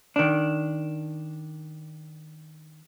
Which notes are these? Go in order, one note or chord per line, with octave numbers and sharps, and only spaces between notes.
D#3 D4